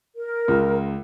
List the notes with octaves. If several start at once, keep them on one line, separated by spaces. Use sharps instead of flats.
A#4
C#2